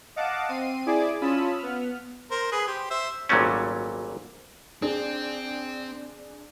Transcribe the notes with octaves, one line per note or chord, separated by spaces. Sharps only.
D#5 F5 F#5 A5 D6
C4 C7 D#7
E4 G#4 D5 G#5 D6
C#4 F4 A5 B5 D#6 E6
B3 F6
A#4 C5
G#4 B4
G4 C5
C5 E5
G#1 A#2 F#3 G3 A3 C#4
C4 D4 G#4